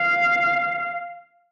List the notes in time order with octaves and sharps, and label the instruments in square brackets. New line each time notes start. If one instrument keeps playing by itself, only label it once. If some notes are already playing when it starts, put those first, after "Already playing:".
Already playing: [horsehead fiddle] F5